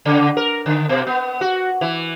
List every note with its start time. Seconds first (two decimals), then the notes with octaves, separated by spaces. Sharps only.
0.05 C#3
0.37 A#4
0.66 D3
0.89 B2
1.07 B3
1.41 F#4
1.81 E3